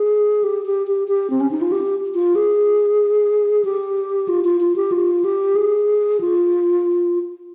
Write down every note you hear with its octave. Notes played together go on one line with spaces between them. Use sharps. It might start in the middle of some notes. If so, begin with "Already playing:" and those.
Already playing: G#4
G4
G4
G4
G4
C4
C#4
D#4
F4
G4
F4
G#4
G4
F4
F4
F4
G4
F4
G4
G#4
F4